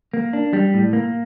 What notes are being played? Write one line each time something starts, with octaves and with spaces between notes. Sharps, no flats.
A#3
D4
G3
A2
A#3